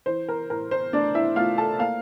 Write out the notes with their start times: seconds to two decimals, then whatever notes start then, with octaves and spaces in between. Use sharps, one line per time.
0.06 E3 C5
0.28 A#4
0.50 A2 A#4
0.71 C5
0.93 A3 D4 D5
1.15 E4 E5
1.36 A3 F4 F5
1.58 A4 A5
1.79 A#3 F5 F6